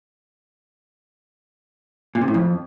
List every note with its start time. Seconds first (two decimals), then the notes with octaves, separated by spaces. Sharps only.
2.15 A#2
2.21 C3
2.28 A2
2.34 F2